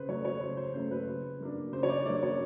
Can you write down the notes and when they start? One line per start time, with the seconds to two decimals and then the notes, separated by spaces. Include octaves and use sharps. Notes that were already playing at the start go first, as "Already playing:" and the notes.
Already playing: C#3 B4 C5
0.09 F#3 A3 C#4 C#5
0.25 C#5
0.41 C#3 C5
0.57 C5
0.74 F#3 A3 C#4 C5
0.91 B4
1.07 C#3
1.40 F#3 A#3 D4
1.73 C#3 C5
1.83 C#5
1.89 D5
2.06 F#3 A#3 D4 D5
2.23 C#5